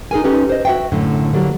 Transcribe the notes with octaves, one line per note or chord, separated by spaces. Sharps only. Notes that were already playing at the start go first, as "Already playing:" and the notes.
D#4 G#4 A#4 G#5
C#4 D#4 G4 A4 B4
C5 D#5
F#4 E5 G5
F#2 A2 D3
D3 F#3 G3 A#3